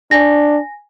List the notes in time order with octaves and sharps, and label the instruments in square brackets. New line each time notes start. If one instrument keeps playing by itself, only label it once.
[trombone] D4 [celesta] G#5 A#6